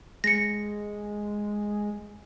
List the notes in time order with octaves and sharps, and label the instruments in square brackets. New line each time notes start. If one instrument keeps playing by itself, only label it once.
[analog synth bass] G#3 [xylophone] A#6 C#7